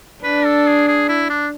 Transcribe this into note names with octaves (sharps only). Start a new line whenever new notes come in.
D4 B4
A4
G#4
G#4
E4
D4